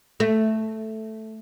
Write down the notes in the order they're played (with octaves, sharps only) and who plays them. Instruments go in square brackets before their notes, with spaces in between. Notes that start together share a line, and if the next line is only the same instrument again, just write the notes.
[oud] A3